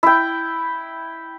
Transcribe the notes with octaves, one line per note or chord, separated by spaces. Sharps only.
E4 G5